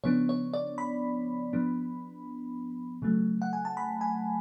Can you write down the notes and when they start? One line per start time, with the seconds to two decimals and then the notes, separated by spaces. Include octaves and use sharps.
0.04 C#3 F3 B3 D4 C#5
0.29 C#5
0.54 D5
0.78 B5
1.53 F3 B3 D4
3.02 C#3 F#3 A3
3.42 F#5
3.53 G#5
3.65 A5
3.77 B5
4.01 G#5